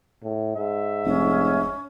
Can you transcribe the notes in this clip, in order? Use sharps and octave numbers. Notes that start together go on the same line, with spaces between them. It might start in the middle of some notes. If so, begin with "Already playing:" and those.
A2
G#2 E5
F1 C#4